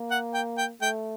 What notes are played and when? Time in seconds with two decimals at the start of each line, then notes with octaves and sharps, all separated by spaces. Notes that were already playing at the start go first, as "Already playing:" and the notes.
Already playing: A#3
0.11 F#5
0.34 G5
0.58 G5
0.81 A3 G5